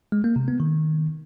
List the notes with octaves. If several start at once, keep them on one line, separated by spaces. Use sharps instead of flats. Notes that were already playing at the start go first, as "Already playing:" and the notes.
G#3
A#3
C3
B3
D#3